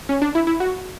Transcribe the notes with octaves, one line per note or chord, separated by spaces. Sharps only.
C#4
D4
E4
E4
F#4